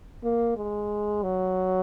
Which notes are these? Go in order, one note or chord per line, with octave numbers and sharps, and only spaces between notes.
A#3
G#3
F#3